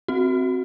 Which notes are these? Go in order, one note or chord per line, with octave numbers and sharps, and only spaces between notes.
C4 F#4